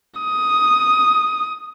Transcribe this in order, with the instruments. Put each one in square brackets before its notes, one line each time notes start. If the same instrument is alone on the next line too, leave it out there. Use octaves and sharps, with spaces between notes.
[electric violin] D#6